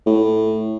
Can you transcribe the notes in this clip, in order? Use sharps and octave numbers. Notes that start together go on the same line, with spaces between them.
A2